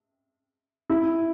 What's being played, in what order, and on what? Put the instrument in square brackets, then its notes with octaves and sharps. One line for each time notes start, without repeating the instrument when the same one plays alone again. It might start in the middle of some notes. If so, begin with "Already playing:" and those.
[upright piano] E4